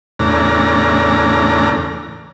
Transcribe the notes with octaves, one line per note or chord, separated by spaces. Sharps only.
E2 A2 C#3 D4 A#5